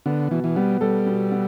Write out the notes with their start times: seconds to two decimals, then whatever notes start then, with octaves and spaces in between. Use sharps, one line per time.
0.06 D3 B3
0.31 B2 E3
0.44 E3
0.56 G3 B3
0.81 G3 A4
1.06 B2
1.32 B3